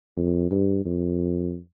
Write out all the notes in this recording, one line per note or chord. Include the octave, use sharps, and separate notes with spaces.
F2
G2
F2